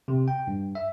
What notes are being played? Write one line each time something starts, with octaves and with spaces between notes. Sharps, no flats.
C3
G5
G2
E5